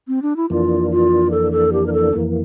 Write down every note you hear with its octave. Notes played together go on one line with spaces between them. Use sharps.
C4
D4
E4
F2 E3 A#3 D4 F4
F4
A4
A4
G4
A#4
A4
F2 E3 A#3